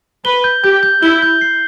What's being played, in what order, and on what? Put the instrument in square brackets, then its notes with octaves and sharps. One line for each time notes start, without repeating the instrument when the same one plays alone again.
[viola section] B4 [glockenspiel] G7
[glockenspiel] G6
[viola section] G4 [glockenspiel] G6
[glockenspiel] G6
[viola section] E4 [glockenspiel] G7
[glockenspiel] G6
C7